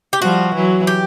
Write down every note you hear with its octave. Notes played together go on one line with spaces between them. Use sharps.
G4
F3 G3 F#4
E3 F#3
G4